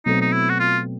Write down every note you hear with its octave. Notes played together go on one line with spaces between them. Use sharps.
B2 F#3 A3 C4 D#4
D#4
E4
F#4
F4